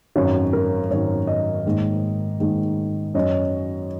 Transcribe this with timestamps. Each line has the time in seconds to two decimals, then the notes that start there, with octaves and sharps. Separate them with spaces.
0.16 G#1 F#2 D#3 F#3 C#4 C#5
0.53 A#4
0.90 G#1 F#2 D#3 F#3 C#4 C#5
1.27 D#5
1.66 G#2 D#3 A#3
2.40 G#2 D#3 A#3
3.14 F#2 F#3 C#4 D#5